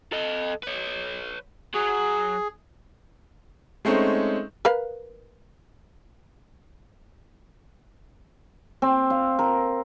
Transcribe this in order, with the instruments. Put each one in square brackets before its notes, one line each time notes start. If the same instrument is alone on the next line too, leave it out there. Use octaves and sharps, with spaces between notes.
[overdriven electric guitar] A4 D#5
B4 C#5
[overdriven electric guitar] F#3 [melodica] G#4
[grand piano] G#3 A3 C4 C#4 D#4
[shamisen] A#4 B4 F5
[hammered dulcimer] C4
F5
A#4